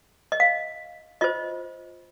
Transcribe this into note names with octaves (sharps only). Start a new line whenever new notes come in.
D#5
F5
F4 C5 D#5